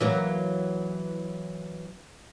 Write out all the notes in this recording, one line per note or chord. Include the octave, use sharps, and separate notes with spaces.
E3 F#3 A#3